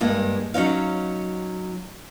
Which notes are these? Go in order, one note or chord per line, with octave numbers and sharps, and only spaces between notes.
G2 G#3 A#3
F#3 C#4 D#4 F5